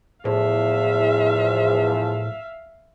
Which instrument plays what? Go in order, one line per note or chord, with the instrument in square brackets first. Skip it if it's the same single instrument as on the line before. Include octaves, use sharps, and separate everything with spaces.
[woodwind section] E2 F3 [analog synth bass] A2 [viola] E5 F5